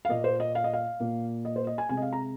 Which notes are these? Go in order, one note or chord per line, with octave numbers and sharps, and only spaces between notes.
F5
A#2 A#3 D#5
C5
D#5
F5
D#5
F5
A#2 A#3
D#5
C5
D#5
G#5
C3 G#3 C4 G#5
D#5
F5
A#5